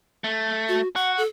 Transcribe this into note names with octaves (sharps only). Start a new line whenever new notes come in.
A3
F#4
F#4 F#5
A4